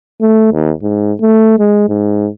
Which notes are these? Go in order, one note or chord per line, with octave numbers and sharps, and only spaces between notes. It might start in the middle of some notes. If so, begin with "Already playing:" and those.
A3
D#2
G#2
A3
G#3
G#2